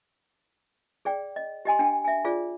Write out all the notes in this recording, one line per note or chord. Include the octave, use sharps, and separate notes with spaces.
G#4 D5 G5
D#5
G4 D#5 G#5 C6
D4 G5 G#5
E5 G#5
F4 G#4 D5